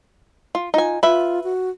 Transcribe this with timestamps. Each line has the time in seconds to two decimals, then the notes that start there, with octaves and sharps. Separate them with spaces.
0.55 F4
0.74 D#4 F4 G#5
1.03 F4 B4 E5
1.44 F#4